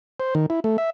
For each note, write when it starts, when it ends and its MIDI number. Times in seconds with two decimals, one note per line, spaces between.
0.20 0.34 72
0.35 0.46 51
0.50 0.60 64
0.64 0.77 57
0.78 0.90 76